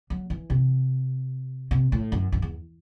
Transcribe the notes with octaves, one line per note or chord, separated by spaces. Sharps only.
F#3
E3
C3
C3
A2
F#2
F#2
E2